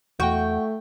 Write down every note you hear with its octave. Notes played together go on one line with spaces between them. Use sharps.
E2 A3 F#4 G5 C#6 G6